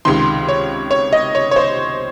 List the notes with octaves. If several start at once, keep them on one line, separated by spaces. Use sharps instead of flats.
C#2 C3 D#3 C6
C#5
C#5
D#5
C#5
C#5
C5